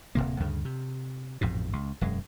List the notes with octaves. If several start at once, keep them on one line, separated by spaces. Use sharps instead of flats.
D1 D#2 C3 A#3
D2 G2 C#3
C3
A1 F2 G#2 B2
C#2
E1 F#2 G#3